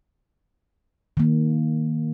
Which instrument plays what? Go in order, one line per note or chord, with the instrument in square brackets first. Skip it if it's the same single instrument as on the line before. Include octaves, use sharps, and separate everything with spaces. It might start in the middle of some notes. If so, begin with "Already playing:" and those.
[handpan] D#3 A#3